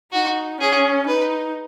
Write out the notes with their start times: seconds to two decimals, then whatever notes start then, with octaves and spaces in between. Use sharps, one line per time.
0.13 D#4 F#4
0.60 C#4 G#4
1.07 D#4 B4